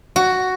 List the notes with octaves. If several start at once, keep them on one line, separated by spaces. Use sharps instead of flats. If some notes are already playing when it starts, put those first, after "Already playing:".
F#4